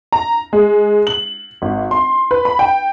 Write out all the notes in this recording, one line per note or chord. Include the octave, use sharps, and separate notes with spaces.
A#5
G#3
F#7
G#1
C6
B4
B5
G5